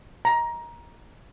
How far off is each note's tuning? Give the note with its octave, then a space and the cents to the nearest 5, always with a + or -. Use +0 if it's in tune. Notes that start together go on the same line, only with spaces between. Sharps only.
A#5 +15